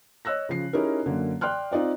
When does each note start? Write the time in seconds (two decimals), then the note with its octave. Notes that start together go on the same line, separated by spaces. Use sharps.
0.25 C#5 D#5 E6 F#6 A#6
0.49 C#3 F3 C7
0.73 C#4 D#4 E4 G4 G#4 A#4
1.06 F#2 D3 A#3
1.41 D5 G5 C6 F6 F#6
1.72 C4 D#4 F4 D5 D#5